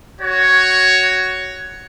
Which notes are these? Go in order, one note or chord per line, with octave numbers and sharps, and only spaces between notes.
F#4 C#5